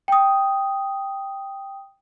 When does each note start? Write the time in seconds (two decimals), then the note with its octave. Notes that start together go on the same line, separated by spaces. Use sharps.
0.08 G5 D#6